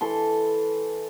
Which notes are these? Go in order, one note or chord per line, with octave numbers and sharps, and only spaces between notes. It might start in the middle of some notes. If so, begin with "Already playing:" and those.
E3 A4 C6